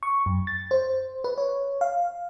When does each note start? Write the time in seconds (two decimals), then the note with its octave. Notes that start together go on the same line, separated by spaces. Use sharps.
0.03 C#6
0.26 F#2
0.47 A6
0.71 C5
1.24 B4
1.38 C#5
1.81 F5